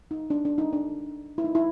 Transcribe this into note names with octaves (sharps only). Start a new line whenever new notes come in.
D#4
D4
D4
D#4
D4
E4
D#4
E4